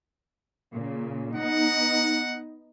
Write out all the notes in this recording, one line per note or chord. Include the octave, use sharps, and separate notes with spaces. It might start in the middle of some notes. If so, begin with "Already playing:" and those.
A#2 C#3
B3 D#4 F#5